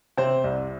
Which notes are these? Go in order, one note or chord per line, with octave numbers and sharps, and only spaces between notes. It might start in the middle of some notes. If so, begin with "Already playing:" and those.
C3 C4 C5
C2